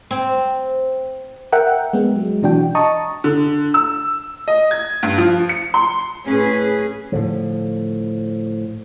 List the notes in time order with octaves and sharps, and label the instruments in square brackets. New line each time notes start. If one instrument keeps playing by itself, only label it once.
[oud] C4
[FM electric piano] A#4 E5 F#5 G5
G#3 B3
F#3 G#3
B2 E3 D4 F#4 G5
D#5 A5 A#5 C#6 D#6
[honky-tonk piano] D3
E6
D#5
G#6
G2
F3
C#7
C6
[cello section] A2 C#4 G#4 B4
[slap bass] A2 D3 F3